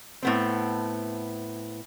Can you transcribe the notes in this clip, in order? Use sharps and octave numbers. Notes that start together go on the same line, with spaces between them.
A2 B3 C4